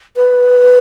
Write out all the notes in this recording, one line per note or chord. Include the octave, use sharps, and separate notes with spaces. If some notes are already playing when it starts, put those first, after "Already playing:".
B4